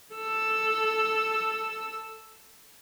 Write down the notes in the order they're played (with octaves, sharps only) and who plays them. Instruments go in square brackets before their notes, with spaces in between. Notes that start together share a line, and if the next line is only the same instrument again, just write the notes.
[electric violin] A4 E6